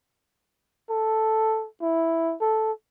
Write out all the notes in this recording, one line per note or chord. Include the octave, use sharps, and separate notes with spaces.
A4
E4
A4